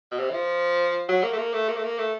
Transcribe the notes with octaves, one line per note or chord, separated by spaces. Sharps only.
B2
C3
E3
F3
F#3
A#3
A3
A#3
A3
A#3
A3
A#3
A3